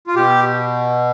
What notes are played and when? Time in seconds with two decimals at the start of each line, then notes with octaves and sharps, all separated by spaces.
0.07 F4
0.15 B2 G4